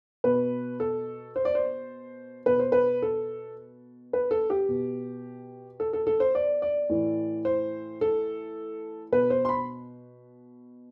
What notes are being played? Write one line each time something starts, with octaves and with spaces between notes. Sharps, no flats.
B2 B4
A4
C5
D5
C5
B2 B4
C5
B4
A4
B4
A4
G4
B2
A4
A4
A4
C5
D5
D5
A2 E3
C5
A4
B2 B4
C5
C6
B5